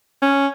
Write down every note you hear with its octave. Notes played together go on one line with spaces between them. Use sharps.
C#4